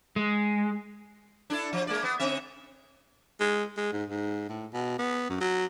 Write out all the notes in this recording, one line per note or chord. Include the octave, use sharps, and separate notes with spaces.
G#3
D4 E4 A4
F3
G#3 A#3 D5
B3
D3 C4 E5
G#3
G#3
G#2
G#2
A2
B2
B3
F#2
F#3